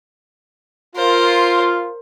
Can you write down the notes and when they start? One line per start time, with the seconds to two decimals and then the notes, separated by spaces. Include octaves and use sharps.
0.96 F4 A#4 C5